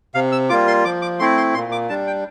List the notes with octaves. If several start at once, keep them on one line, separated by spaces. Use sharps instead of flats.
C3 F5
E6
G3 A#3 F4 D6
C6
F3 D6
D6
A3 C4 E4 C6
C6
A#2 C6
D6
G3 D4 A5
G5